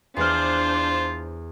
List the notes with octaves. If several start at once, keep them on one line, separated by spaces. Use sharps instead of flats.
E2 D4 F4 C5 F6